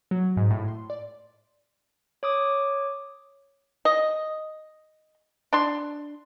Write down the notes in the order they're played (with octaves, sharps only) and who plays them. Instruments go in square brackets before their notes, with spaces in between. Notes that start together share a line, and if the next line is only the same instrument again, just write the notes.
[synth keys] F#3
G#2
A2
C6
D5
[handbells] C#5 D6 D#6
[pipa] D#5
D4 C6